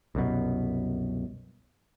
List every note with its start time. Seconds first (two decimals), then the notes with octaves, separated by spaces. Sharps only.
0.15 C2 F#2 B2